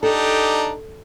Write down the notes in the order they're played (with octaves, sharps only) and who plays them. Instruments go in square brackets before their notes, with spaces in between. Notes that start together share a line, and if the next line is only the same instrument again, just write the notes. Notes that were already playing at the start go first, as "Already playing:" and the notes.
[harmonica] D4 D#4 G4 [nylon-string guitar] A4